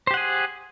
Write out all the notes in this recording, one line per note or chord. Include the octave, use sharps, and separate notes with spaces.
G4 G#4 C5 F#5